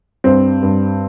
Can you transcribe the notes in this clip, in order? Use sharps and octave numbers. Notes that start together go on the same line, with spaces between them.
G2 C4
G2